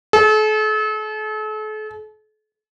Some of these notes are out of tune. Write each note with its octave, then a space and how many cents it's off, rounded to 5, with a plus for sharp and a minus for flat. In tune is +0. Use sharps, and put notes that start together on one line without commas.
A4 -40